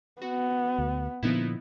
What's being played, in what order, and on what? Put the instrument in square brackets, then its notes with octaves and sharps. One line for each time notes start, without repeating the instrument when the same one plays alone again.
[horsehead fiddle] B3 [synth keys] F#4
[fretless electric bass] D2
[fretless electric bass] A#2 D3 F3 [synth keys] B3 D#4 E4